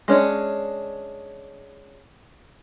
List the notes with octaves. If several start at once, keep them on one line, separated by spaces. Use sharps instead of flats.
G#3 C#4 D4